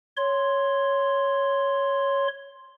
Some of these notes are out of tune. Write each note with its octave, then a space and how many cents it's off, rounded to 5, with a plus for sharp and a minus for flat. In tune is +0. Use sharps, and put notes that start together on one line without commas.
C#5 +0 C6 +5